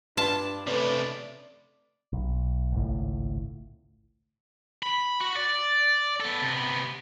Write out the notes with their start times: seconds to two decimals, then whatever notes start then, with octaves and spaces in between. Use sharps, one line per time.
0.17 G2 D4 F4 A5
0.67 C3 A3 C#4 D4 B4 D5
2.13 B1
2.73 G#1 C#2 A2
4.83 B5
5.21 F#4
5.36 D5
6.20 B3 A4
6.42 C3 B3